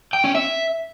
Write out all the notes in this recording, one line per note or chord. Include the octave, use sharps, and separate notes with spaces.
G5
C#4
E5